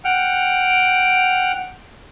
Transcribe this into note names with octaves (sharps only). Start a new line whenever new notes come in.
F#5 G5 F6